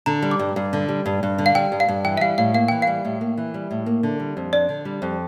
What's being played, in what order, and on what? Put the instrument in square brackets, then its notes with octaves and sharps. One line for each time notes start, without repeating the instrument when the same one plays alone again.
[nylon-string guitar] D3 [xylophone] A#5
[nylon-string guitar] G3
[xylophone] D6
[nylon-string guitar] G2
G2
D3
G3
G2
G2
D3
[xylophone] F5
[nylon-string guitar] G3 [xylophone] G5
[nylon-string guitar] G2
[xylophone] F5
[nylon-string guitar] G2
[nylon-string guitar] E3 [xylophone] G5
[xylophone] E5
[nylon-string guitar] G3 [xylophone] F5
[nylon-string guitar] A2 [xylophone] F5
[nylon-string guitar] A#3 [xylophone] F5
[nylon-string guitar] E3 [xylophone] G5
[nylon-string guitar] G3 [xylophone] F5
[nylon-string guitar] A2
A#3
E3
G3
A2
A#3
D3
G3
F2
[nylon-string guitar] D4 [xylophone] D5
[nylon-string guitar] D3
G3
F2